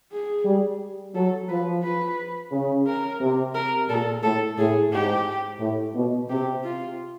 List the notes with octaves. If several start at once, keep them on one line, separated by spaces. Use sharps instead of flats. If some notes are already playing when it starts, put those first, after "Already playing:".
G#4
G3
F#3 A4
F3 B4
B4
C#3
A#4
C3
A#4
A#2 A4
A2 A4
A2 G#4
G#2 G4
A2
B2
C3 G4
F4